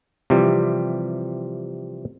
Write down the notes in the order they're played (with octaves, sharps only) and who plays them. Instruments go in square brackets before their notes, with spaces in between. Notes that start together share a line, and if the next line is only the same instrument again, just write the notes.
[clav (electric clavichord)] C3 E3 F3 G3